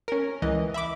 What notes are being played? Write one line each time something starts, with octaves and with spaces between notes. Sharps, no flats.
C#4 A#4
C#2 E3 D#5
E5 B5 D6